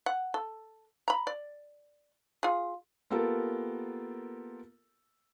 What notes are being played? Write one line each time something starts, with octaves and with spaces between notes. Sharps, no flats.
F#5
A4
A#5 B5
D5
F4 G#4
A#3 B3 F4 G4 A4 A#4